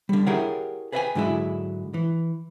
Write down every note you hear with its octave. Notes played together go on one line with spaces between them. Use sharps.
D3 G3
E4 G4 G#4 A#4 C#5 F#5
G#4 B4 C5 E5 G5 G#5
G#2 D3 F#3 G#3 E4
E3